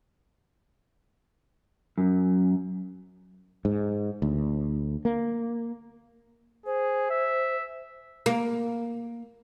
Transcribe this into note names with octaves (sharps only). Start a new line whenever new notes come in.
F#2
G#2
D2
A#3
G#4 C5
E5
A#3